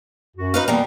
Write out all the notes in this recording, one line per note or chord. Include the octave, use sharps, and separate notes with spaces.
F#2 F#4
D#4 B4 F5
B2 E3 G3 A#3